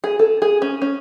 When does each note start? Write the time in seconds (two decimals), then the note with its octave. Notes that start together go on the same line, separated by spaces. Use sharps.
0.04 G#4
0.19 A4
0.42 G#4
0.62 C#4
0.82 C#4